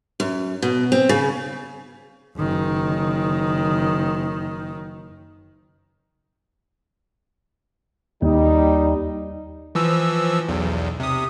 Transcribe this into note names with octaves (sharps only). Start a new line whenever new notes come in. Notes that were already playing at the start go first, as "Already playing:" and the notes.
F#2
B2
C4
C#3
F#1 D#3
D#2 G3 D#4
E3 F3 E6
B1 E2
C3 D#6